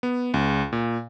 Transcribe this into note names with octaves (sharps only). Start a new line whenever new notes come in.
B3
C#2
A#2